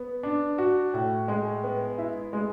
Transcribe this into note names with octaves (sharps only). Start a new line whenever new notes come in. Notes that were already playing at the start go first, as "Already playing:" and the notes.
Already playing: B3
D4
F#4
A2
G#3
B3
E4
G#3